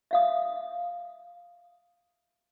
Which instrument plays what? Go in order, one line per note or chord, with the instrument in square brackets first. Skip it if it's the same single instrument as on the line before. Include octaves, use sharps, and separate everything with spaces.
[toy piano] E5 F5 D#6